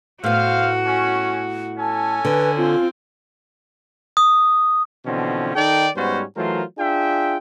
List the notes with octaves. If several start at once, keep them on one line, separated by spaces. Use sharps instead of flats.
A2 B3 F#4 C5 F5
C#4
C#4 A4 G#5 A5
D3 B4
C4 F4
D#6
B2 D3 E3 F3 C4 C#4
D#3 D#4 A4 D5 G5
G#2 G3 B3 C#4 F#4 C5
E3 F#3 A3 F4 A#4 C5
D4 F4 G#4 E5 G5